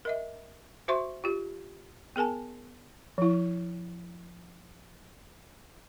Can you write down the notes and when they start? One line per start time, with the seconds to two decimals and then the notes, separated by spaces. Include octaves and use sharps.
0.05 A#4 D#5 E5
0.88 F#4 C5 E5 C6 C#6
1.24 F4 G4
2.16 B3 G#4 A#4 G#5 A5
3.18 F3 E4